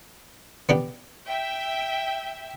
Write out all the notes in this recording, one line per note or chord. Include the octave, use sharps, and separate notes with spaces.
B3 D4 G4
E5 G5